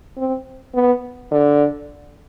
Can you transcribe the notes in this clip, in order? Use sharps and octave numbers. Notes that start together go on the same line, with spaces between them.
C4
B3
D3